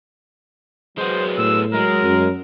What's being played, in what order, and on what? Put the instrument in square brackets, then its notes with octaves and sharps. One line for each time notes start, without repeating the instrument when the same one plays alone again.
[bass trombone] F#3 [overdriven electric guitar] G#3 B3 [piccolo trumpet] C5
[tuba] A2 [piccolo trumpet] E6
[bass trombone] F#3 [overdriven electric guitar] G#3 [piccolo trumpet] A#4
[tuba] F#2